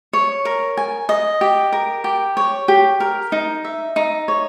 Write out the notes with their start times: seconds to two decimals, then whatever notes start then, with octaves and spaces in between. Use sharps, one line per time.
0.13 C#5
0.45 A#4
0.77 G#5
1.09 D#5
1.41 G4
1.73 A#4
2.04 G4
2.37 C#5
2.68 G4
3.00 A#4
3.32 D#4
3.65 E5
3.96 D#4
4.28 C#5